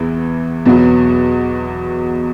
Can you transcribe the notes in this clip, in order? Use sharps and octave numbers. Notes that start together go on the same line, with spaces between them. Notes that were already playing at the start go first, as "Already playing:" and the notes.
Already playing: E2 E3 B3 E4
E2 B2 F#3 B3 F#4